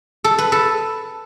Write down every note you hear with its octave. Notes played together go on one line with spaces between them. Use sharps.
A4
B4
A4